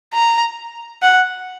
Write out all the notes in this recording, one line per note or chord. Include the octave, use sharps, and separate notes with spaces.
A#5
F#5